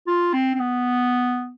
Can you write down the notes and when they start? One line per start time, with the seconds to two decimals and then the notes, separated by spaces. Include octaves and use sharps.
0.07 F4
0.33 C4
0.54 C4
0.59 B3